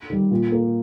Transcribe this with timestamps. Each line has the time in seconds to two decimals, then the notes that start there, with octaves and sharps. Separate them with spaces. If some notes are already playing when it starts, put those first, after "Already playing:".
0.10 D#3 G3
0.31 A#2
0.52 A#3